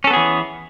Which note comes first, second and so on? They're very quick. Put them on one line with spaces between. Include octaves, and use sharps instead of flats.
C#4 A4 B3 G#4 E3